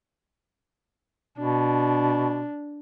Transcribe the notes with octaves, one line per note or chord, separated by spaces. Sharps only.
B2 D4